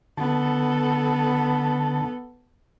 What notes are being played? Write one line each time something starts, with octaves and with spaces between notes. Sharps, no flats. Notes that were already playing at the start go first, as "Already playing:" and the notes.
D3 B3 A4 A5